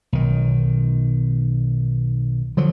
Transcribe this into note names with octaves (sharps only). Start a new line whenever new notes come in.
B1 D#3
D3 F3 F#3